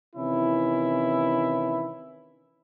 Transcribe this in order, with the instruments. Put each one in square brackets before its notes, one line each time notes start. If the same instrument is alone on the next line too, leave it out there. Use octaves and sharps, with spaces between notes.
[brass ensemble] C3 D#3 E3 C#4 E4